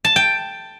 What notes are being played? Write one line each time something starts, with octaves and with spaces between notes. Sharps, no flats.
A5
G5